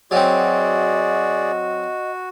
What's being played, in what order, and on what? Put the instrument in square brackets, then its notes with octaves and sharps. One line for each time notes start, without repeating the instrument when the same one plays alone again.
[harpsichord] F#3 C4 [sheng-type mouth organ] F#4 [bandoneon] G#4 D5 [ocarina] D#5